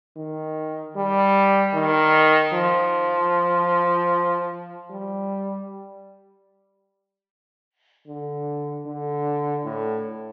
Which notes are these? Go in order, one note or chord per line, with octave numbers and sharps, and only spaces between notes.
D#3
G3
D#3
F3
G3
D3
D3
A2